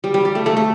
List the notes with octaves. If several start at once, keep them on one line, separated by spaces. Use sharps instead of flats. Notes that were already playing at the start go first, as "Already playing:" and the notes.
G3
G3
G3
A3
A3
A3